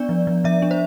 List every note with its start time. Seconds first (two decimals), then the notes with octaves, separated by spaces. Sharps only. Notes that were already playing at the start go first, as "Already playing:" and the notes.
Already playing: B3 D4 D5
0.09 F3
0.27 F3
0.44 F3 E5
0.62 D4
0.71 C5